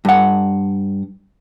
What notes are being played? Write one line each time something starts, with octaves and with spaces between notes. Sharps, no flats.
G2 F#5